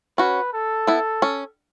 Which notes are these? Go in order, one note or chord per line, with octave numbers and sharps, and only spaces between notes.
C#4 F#4 B4
A4
B3 E4
C#4